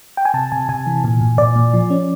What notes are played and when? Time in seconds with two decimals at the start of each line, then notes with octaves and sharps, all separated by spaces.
0.17 G5
0.25 G#5
0.34 C3 A5
0.52 C3 G#5
0.69 C3 G#5
0.86 E3
1.04 A#2
1.21 A#2
1.38 A#2 D5
1.56 A#2
1.74 F3
1.90 C#4